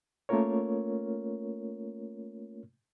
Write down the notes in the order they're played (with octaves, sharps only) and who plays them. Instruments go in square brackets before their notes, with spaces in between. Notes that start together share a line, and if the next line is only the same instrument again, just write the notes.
[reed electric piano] A3 A#3 C#4 F4 A#4 C#5